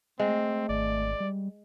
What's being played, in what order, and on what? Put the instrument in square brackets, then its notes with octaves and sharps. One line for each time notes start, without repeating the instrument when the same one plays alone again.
[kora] G#3 [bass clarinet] A3 [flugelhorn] C4
[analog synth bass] G#1 [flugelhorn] D5
[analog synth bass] G3